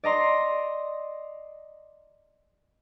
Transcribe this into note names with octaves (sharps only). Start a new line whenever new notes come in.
D5 D#5 A#5 C6